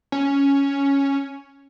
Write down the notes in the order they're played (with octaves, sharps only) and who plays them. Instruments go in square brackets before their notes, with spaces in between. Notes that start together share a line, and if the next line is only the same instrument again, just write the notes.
[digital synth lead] C#4